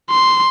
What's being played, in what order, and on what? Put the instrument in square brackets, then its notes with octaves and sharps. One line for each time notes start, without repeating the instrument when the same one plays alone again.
[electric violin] C6